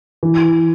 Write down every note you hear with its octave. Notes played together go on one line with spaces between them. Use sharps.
E3